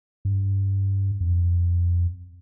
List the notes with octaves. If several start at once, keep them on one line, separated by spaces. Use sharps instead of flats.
G2
F2